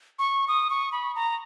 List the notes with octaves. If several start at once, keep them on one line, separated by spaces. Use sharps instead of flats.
C#6
D#6
C#6
B5
A#5